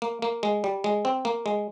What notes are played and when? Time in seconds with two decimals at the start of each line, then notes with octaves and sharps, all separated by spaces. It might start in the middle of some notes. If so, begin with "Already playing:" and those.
0.02 A#3
0.22 A#3
0.43 G#3
0.64 G3
0.84 G#3
1.05 C4
1.25 A#3
1.46 G#3